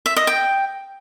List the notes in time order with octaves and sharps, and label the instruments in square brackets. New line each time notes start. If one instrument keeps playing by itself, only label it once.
[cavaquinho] E5
D#5
G5